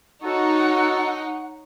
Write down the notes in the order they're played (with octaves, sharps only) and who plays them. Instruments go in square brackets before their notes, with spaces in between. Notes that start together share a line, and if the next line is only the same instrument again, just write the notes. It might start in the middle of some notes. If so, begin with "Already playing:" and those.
[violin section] D#4 [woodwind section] F#4 A4 [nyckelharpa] C#5 [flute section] F#5